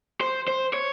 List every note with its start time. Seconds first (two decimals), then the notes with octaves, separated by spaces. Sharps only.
0.21 C5
0.48 C5
0.73 C#5